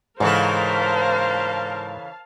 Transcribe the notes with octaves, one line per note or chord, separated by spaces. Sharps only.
G#2 C#3 E3 A4 A#4 C5 F5 A5